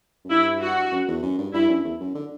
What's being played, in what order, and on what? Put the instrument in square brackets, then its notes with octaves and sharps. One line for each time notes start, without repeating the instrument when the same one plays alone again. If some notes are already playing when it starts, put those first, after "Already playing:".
[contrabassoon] F#2
[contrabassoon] G2 [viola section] E4
[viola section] F#4
[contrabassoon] F#2
E2
F#2
G2
[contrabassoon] G2 [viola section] E4
[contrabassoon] F#2
E2
F#2
D3